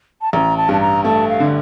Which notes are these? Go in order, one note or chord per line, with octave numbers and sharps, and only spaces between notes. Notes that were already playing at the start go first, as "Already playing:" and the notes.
A5
A1 A#5
A5
G2 A5
A#5
A3 A5
F5
D3